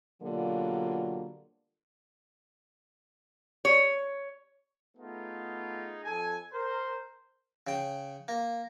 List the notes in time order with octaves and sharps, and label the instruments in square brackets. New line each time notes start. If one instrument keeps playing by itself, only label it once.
[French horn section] B2 D3 F#3 G3 A#3 F4
[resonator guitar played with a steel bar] C#5
[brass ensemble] A3 B3 D#4 F4 G#4
F2 A4 G#5
A#4 C5
[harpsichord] C#3 G5
A#3